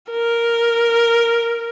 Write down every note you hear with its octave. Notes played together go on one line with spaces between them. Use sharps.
A#4